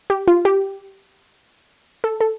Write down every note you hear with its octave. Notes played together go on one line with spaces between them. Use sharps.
G4
F4
G4
A4
A4